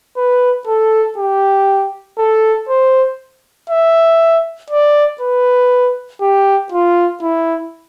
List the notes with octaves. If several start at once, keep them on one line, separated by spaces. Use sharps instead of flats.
B4
A4
G4
A4
C5
E5
D5
B4
G4
F4
E4